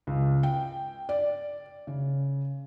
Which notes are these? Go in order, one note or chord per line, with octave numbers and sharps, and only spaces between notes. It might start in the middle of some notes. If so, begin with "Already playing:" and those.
C#2
G5
D5
C#3